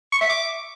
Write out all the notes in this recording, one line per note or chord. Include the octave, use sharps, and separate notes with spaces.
C#6
E5
D6